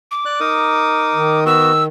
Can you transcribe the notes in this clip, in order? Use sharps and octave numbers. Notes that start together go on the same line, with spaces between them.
D6
D5 F#6
D#4 A#4 D#6
D#3
B3 F#4 E6